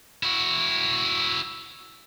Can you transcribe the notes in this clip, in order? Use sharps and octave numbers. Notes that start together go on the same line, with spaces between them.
E4 F#4